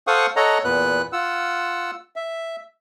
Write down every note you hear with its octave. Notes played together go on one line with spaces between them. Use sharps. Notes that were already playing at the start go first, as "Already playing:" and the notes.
A4 C5 F5 F#5 C#6 D#6
A4 C#5 D#5 F#5 A#5
E2 A#2 B3 B4 F#6
F4 F#5 E6
E5